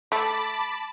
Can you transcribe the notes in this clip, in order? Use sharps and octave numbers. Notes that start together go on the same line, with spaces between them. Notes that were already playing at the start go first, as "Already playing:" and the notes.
A3 A5 B5 D6